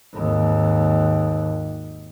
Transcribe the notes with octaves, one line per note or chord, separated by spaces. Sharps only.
G#1 D#2